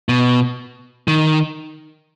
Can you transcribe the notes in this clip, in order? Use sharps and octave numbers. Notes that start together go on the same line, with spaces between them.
B2
D#3